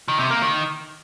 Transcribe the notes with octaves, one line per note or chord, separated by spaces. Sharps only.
D#3
C3
A#3
D#3